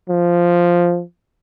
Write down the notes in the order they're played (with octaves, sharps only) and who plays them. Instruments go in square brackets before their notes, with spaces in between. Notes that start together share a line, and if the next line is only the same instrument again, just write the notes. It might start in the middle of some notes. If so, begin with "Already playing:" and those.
[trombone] F3